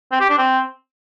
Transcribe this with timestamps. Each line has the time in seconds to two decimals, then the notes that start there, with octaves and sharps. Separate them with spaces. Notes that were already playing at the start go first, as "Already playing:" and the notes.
0.12 C4
0.21 G4
0.29 D4
0.38 C4